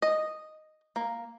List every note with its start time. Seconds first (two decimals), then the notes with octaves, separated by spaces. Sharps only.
0.02 D#5
0.96 A#3